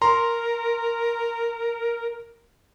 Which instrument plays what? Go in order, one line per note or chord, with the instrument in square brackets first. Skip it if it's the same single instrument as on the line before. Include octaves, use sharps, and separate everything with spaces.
[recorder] A#4 [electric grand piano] A#5 C6